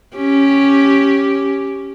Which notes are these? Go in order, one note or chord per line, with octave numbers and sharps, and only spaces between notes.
C#4 G4